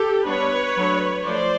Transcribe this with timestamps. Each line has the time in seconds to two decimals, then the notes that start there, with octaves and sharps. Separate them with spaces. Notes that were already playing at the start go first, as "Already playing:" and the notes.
Already playing: G4 A4
0.26 G3 B3 D4 B4 C#5
0.77 F#3 A3 D4
1.26 F3 A3 C5 D5